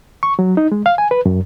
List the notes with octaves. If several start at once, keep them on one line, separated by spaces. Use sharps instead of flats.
C#6
F#3
D#4
G#3
F5
G#5
B4
F#2